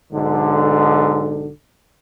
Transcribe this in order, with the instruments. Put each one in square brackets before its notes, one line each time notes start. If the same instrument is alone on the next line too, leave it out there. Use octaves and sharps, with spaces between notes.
[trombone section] B1 G#2 D3